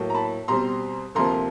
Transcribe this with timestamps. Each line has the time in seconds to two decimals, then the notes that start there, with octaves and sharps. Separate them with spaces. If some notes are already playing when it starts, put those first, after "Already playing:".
Already playing: A2 F#3 A#3
0.10 A#5
0.15 A5 B5
0.48 B2 G3 C4 A#5 C6
1.15 D2 C3 F3 A#3 A#5 C6